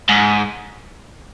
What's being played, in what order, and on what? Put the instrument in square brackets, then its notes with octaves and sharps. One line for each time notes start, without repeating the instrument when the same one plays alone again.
[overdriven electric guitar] G#2